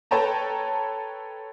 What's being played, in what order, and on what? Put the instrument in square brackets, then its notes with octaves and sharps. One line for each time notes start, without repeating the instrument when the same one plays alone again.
[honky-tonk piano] A4 B4 C#5 G5 A5 A#5